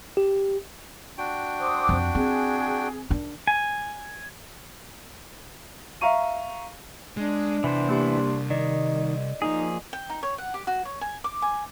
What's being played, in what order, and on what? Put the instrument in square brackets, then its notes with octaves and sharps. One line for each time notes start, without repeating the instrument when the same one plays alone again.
[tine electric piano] G4
[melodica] D4 F#4 G5
[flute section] C5 D6 D#6
[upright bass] F2
[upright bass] C4 [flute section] G#4
[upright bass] D#3 D4
[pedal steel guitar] G#5
[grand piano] E5 F5 A#5 C#6 D#7
[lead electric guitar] G#3 [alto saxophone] D4
[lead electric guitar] C2 [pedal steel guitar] E3 B3 C5
[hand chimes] A#3 G4 C6
[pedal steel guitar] D#3 [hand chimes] D5 D#5
[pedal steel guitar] F3 A#3 G#4 [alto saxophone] D#4
[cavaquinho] G5
D#4
C#5
F#5
G4
F#4
C#5
G#5
D6
G#5